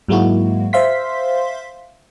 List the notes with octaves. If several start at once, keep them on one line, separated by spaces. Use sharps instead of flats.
G#2 F#3 G#3 A#3 E4 F#4
C5 E5 F5 C6 B6